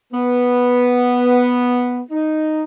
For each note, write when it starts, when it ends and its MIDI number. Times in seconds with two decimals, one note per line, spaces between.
0.13 2.01 59
2.11 2.64 63